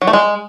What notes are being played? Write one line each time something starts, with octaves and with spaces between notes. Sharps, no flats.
F#3
A3
G#3